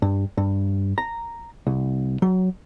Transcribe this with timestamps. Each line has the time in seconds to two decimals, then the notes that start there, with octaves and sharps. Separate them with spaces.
0.02 G2
0.37 G2
0.98 A#5
1.67 C2
2.22 F#3